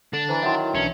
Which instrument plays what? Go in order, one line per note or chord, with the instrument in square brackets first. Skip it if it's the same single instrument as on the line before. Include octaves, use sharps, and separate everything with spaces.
[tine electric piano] D3 [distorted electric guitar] D4
[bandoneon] E3 [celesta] C5 A#5 B5
[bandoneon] D#3 F#3 [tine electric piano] E4 G5 [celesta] E5 F#5 C6
[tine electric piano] B1 E3 D4 [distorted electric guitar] C#4 [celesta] E5 C#7